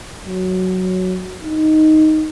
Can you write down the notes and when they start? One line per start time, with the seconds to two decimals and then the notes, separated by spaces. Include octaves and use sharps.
0.25 F#3
1.44 D#4